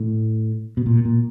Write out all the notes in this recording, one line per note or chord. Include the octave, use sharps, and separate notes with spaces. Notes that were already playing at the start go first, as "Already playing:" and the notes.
Already playing: A2
B2
A#2
A#2